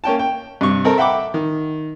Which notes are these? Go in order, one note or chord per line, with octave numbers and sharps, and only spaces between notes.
A#3 C#4 G5 A5
G5
G2 C3 C#6
C4 A4 A#4
E5 F#5 G5 B5 D6
D#3